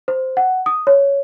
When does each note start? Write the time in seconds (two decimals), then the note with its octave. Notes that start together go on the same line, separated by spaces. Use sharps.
0.08 C5
0.37 F#5
0.66 D#6
0.87 C#5